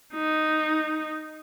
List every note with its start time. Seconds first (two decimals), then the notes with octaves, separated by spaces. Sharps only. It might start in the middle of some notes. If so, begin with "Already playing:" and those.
0.14 D#4